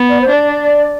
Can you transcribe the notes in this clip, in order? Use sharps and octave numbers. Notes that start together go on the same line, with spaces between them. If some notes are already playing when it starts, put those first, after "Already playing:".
Already playing: B3
D5
C5
D4 D5